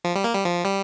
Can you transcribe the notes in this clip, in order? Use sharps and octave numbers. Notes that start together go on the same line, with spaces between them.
F3
G3
A#3
G3
F3
G3